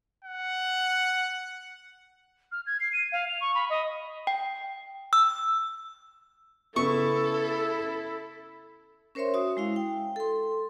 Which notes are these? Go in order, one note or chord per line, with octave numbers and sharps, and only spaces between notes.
F#5
F6
G#6
C7
D#7
F5
F7
C#6
B5
D#5
G5
E6
C#3 B3 E4 A4 C#6
C#4 A#4 C5 C#5 E5 C6
F#4 E5 D#6
G#3 E4 F5
G5
A4 C6